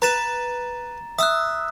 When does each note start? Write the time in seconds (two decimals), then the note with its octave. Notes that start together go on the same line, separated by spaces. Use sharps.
0.02 B4 A#5 A6 E7
1.19 E5 D#6 E6 F#6